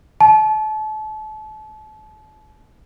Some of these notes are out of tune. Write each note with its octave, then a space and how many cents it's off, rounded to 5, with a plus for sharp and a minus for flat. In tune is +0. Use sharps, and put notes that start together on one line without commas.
A5 -35